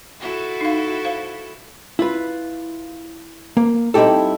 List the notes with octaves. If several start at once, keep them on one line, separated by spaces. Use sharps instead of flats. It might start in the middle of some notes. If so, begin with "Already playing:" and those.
E4 F#4 A4
D#4 F5
C5 F5
E4 F4 B4
A#3
G3 C4 D#4 E4 G4 A4